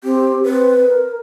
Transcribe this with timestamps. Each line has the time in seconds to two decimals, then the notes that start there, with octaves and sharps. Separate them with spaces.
0.04 C4 G4
0.44 C4 B4
0.87 A#4